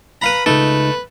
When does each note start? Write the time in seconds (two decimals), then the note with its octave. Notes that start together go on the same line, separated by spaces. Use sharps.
0.22 B4 F5 A#5 B5
0.46 C#2 A3 D#4 A4 B4